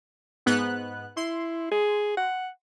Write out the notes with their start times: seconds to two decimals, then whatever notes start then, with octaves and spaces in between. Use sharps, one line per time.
0.46 G#2 B3 F#6
1.17 E4 C6
1.71 G#4
2.17 F#5